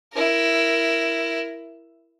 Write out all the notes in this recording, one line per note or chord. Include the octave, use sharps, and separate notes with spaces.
E4 A#4